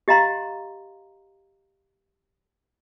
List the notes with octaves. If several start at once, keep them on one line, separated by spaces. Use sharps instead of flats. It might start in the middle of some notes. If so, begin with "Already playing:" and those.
G4 D#5 F5 A#5 C6